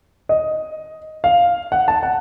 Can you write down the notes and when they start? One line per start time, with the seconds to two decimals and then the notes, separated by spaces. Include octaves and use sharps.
0.29 D#5
1.24 F5
1.72 F#5
1.88 A5
2.03 F#5